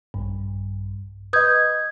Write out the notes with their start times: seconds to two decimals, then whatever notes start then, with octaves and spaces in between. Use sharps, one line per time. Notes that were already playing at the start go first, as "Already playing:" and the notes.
0.14 A#1 G2
1.33 B4 D#5 D#6 G6 G#6